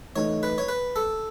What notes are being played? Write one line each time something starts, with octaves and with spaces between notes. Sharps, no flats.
E3 A3 D#4 C#5
B4
C#5
B4
A4